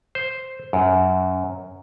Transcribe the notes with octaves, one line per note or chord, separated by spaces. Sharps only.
C5
F#2